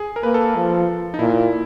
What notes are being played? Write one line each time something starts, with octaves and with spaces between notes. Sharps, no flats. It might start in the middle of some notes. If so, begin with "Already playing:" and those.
Already playing: G#4
A#4
A#3 B4
A4
A4
F3
D#4
A#2 E4